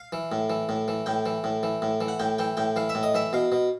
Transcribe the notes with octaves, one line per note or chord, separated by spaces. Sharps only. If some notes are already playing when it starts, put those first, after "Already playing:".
Already playing: F5
E3
A2
E3
A2
E3
A2 G5
E3
A2
E3
A2
E3
F#5
A2 G5
E3 G5
A2 G5
E3 F5
E5
A2
D#5
E3 E5
B2 F5
B2